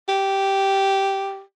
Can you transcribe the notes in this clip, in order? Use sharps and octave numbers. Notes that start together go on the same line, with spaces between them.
G4